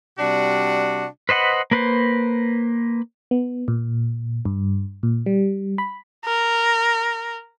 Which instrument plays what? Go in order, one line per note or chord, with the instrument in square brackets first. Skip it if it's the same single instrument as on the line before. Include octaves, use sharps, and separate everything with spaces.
[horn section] C3 G3 D4 F#4
[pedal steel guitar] B4 C5 D#5 F#5 B5
A#3 B4 C5
[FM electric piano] B3
A#2
G2
A#2
G3
B5
[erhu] A#4